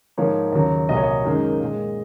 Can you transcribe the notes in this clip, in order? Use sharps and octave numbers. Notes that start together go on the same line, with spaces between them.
G#2 F3 A#3 C#5
D#2 C#3 F#3
C2 A#2 F#3 D#5
C#5
D#5
F#2 D#3 G#3
A#2 G#3